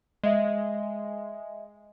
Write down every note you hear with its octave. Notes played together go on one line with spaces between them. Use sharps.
G#3 D#5 E5